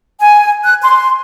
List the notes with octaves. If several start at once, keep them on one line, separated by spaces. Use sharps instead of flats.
G#5
F#6
C6